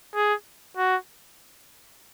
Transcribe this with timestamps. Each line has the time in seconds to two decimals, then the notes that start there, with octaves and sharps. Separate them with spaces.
0.15 G#4
0.77 F#4